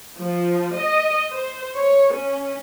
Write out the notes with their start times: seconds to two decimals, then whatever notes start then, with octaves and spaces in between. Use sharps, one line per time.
0.18 F3
0.77 D#5
1.31 C5
1.76 C#5
2.13 C#4